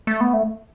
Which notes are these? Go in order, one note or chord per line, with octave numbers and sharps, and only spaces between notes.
A3
B3
A3